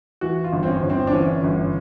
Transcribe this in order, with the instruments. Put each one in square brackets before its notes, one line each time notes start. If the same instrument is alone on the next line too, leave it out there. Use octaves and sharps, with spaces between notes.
[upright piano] E3 F#4
F4
G1
C4
C#4
G1
C4
D4
E3 C#4
G1